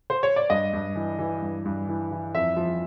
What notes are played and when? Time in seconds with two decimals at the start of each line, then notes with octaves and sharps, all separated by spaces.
0.10 C5
0.23 C#5
0.36 D5
0.50 G2 D#5
0.73 G2
0.95 E3
1.19 E3
1.42 G2
1.65 G2
1.88 E3
2.11 E3
2.34 F2 E5
2.56 F3